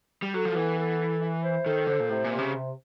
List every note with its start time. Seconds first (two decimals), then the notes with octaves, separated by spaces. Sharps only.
0.22 G3
0.34 F#3 A4
0.45 F3
0.55 E3 B3
0.78 A4
1.00 E4
1.21 E4
1.43 C5
1.66 D#3 A4
1.87 D3 C5
2.00 A#2
2.09 A2 C3
2.24 A#2
2.32 C3
2.39 C#3
2.54 C3